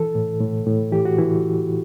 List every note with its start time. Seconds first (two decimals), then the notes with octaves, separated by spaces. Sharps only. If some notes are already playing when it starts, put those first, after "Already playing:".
Already playing: E3 A4
0.15 A2
0.40 A2
0.67 A2
0.92 E3 G4
1.05 F#4
1.18 E3 E4